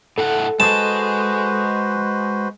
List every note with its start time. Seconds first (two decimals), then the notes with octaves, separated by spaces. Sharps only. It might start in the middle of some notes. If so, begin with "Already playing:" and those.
0.18 A2 A3 A4 F#5
0.60 G#3 F#4 G#4 B4 C5 A5